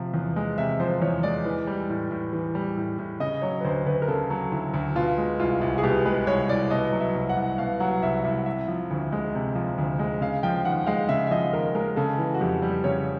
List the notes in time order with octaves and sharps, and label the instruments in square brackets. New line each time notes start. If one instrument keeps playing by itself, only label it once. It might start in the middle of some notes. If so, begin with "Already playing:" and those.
Already playing: [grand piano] C3 F3
E2
G#3
C3 E5
F3 C5
E2 C#5
G#3 D5
E3
G3
A2
A2
E3
G3
A2
A2
C#3 D#5
F#3 C#5
B4
D2 C5
D2 B4
A#4
C#3 A4
F#3
D2 E4
D2
B2 F4
G#3
C2 F4
C2
G#4
B2 G4
G#3 B4
C2 C#5
C2 D5
B2 D#5
F#3
E5
C2
F#5
C2
B2 F5
F#3 F#5
C2 E5
C2 E5
C3 E5
F3
D2
G#3
C3
F3
D2
G#3
C#3 F5
F3 G5
D#2 F#5
G#3 F5
C#3 E5
E5
F3 D#5
D#2 A#4
G#3 A#4
C#3 A4
E3
F#4
F2 G4
G3
C#3 C#5